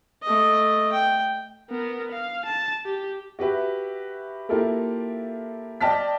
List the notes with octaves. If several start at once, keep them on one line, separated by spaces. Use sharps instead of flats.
A3 D#5
G5
B3 A#4
F5
A5
G4
F#4 G4 B4 E5
A#3 E4 F4 G4 A4 A#4
D5 D#5 G5 A5 F6 B6